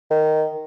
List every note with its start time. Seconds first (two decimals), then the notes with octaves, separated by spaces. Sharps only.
0.11 D#3